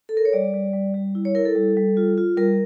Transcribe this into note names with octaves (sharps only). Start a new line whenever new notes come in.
A4
A#4
C#5
G3 D5
G3
G3
G3
E4
C#5
E4 A#4
A4
G3
G3
F4
F4
G3 A#4